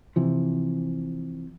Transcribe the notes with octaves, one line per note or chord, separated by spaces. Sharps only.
C3 E3 F3